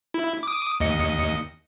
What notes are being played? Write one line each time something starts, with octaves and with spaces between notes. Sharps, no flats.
E4
D6 D#6
D#2 D#5 C#7